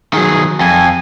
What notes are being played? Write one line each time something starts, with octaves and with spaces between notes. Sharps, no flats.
D#3 F#3 G#4
F2 G#5